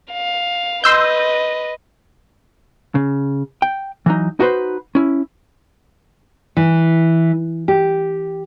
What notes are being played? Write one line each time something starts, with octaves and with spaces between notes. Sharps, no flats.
F5
B4 D#5 C6 E6 G6
C#3
G5
E3 F#3 D#4
D#4 F#4 G#4 B4 C5
C#4 E4
E3
G4